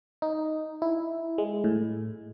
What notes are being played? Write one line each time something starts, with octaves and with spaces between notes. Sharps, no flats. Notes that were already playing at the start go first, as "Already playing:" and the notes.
D#4
E4
G#3
A2